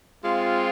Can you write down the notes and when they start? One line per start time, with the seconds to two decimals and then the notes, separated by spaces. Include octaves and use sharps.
0.24 G#3 C4 F4